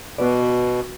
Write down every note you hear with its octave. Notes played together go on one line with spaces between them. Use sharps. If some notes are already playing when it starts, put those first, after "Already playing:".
B2 B3 F#4 B4 D5